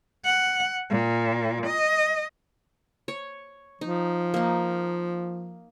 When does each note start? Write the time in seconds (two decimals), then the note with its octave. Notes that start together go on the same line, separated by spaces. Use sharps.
0.25 F#5
0.90 A#2
1.67 D#5
3.08 C#5
3.81 F3 D#4
4.34 A#3 D#4